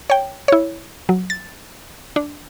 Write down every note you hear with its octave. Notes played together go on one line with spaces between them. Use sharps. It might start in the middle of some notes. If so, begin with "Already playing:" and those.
C#5 G5
E4 C#5
F#3
A6
D4